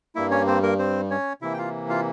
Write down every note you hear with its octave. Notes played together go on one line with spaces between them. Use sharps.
G2 G3 A#3 E4 E5
C#4 C#5
C4 C5
A#3 A#4
C4 C5
C#4 C#5
C3 E3 A#3 E4 E5
G5
F4 F5
F4 F5